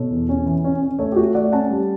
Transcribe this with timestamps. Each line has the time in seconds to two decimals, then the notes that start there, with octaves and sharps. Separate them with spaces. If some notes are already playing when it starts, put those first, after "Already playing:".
Already playing: B2 A4 C#5
0.10 E2
0.29 C#4
0.46 E3
0.64 C#4
0.82 C#4
0.99 A3 A4 C#5
1.12 G4
1.16 A3 F#4 A4
1.34 A3 D5 F#5
1.52 C#4 F#5 A5
1.70 G3